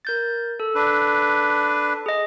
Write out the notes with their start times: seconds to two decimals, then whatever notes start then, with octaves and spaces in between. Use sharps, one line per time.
0.05 A#4 G6 A6
0.60 A4
0.75 D4 B4
2.06 G#4 D#5